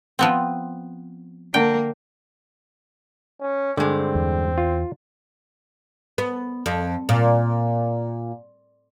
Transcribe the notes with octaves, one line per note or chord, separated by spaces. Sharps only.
F3 B3 C4
D3 A#3 G5
C#4
G2 D3 G#3 C4
E2
F4
B3
F2
A#2